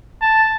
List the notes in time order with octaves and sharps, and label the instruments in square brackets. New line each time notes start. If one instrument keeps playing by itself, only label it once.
[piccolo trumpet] A5